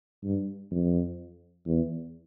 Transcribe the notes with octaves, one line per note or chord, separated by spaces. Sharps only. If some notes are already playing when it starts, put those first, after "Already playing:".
G2
F2
E2